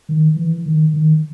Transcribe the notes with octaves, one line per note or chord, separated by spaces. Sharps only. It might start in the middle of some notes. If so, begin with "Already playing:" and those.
D#3
E3
D#3
D#3